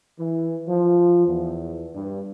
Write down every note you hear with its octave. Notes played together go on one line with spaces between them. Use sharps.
E3
F3
E2
G2